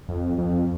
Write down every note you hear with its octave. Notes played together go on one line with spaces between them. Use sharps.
F2
F2